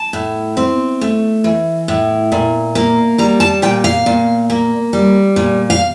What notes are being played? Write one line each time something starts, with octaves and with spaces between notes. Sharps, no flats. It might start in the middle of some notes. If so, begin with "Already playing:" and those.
Already playing: A5
A2
C4
A3
E3
A2
A#2
A#3
G3 A#5
A5
A#2 G5
F5
A#2
A#3
G3
A#2
F5